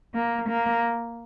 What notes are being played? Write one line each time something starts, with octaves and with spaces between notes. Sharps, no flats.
A#3
A#3